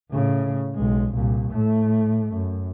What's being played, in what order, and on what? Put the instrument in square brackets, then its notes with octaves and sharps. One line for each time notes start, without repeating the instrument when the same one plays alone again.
[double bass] A2 C#3
B1 G#3
C2 A#2
A2 A3
F#2